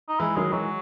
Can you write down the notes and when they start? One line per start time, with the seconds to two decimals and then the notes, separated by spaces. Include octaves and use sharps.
0.09 D#4
0.20 E3 G#3 E4
0.36 D#3 F#3 G#3
0.53 E3 F#3 G#3